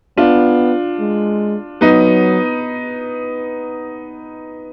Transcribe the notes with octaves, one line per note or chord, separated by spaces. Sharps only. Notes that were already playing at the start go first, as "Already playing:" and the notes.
B3 D4 F4
G#3
F#3 B3 D#4